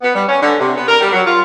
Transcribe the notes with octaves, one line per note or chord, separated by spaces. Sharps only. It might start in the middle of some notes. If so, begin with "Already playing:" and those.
B3
G3
C#4
D3
C3
B3
A#4
G3
F#3
F4